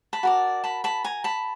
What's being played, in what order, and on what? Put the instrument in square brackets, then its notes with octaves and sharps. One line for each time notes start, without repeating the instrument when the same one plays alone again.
[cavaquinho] A5 B5
F#4 A#4 D5
A5 B5
A5 B5
G#5 A#5
A5 B5